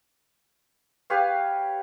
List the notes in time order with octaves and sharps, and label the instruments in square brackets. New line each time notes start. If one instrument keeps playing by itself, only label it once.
[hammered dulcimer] G4 B4 C#5 F5